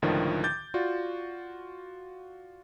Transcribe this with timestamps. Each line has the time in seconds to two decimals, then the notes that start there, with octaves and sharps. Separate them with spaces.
0.02 C#2 A2 D3 D#3 F3
0.44 D6 G6 A6
0.74 F4 F#4 D5